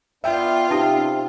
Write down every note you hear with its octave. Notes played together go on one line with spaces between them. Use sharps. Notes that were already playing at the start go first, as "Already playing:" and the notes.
B3 D4 F4 E5 G5
C3 C4 C#4 D#4 G4 F5